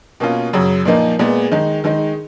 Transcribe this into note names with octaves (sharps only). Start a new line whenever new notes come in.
B2 A#3 C#4 F4
F#2 C#3 F#3
A#2 F3 A#3 D#4
A#2 G#3 B3
D#3 G#3 D#4
D#3 G#3 D#4